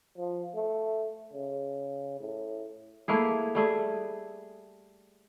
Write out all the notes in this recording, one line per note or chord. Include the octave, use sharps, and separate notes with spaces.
F3
A3
C#3
A2
A3 A#3 E4 G#4
G3 A3 G#4